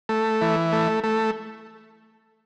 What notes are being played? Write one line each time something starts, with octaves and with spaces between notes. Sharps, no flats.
A3
E3
A3
A3